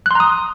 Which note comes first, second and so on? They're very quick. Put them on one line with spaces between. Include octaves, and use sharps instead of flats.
F#6 C6 A#5 D#6